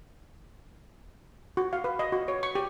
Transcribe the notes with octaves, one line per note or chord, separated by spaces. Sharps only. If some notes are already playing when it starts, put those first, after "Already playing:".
F#4
F5
B4
D#5
F#4
C#5
C#6
G4